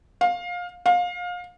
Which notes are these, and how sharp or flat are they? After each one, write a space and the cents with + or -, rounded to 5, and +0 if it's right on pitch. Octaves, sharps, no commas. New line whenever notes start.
F5 +20
F5 +25